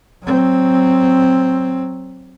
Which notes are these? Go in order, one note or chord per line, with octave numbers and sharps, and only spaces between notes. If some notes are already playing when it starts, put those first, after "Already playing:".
F#3 C4